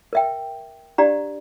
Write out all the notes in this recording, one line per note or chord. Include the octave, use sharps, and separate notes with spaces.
A#4 E5 G5
D4 G4 D5 F5 A#5